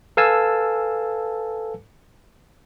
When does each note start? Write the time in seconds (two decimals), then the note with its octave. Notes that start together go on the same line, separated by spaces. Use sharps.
0.17 A4 B4 F5 G#5 A5 E6